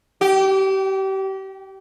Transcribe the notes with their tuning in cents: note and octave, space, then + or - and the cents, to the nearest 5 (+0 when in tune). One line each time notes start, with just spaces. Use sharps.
G4 -30